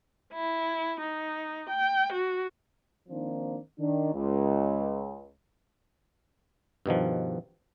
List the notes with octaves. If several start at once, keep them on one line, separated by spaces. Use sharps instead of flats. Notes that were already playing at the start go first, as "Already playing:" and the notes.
E4
D#4
G5
F#4
D#3 F3 A#3 C4 D4 D#4
D#3 D4
C#2
G2 B2 D#3 F3